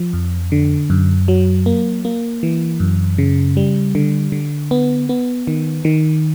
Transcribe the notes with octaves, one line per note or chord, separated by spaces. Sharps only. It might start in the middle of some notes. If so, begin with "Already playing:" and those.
Already playing: F3
F2
D3
F#2
F#3
A#3
A#3
E3
F#2
C#3
G3
D3
D3
B3
B3
D#3
D#3